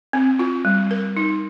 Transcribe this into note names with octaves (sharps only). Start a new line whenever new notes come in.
C4
F4
G3
A#4
D#4